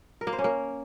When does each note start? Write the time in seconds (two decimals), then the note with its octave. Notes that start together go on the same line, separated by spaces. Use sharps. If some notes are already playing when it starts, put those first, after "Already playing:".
0.21 A#4
0.27 A#3
0.33 C5
0.38 C#4
0.44 A#3